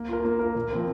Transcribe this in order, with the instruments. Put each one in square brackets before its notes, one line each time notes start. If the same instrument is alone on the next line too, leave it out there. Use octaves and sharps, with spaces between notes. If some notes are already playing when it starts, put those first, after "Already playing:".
Already playing: [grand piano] A#3
F4 A#4
A#3
F4 A#4
A#2
F3 C4 A#4